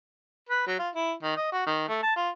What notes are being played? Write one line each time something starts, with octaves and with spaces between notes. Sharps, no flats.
B4
F#3
F4
E4
D#3
D#5
F#4
D#3
A3
A5
F4